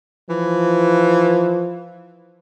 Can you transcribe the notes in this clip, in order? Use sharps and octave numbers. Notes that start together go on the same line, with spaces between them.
E3 F3